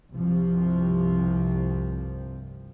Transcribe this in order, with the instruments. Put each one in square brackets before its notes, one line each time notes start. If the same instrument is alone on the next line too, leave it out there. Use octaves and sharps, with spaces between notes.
[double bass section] C2 G2 C3 F3